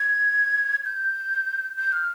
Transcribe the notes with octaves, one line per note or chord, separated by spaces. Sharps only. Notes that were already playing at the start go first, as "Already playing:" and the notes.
Already playing: G#6
G6
G6
F6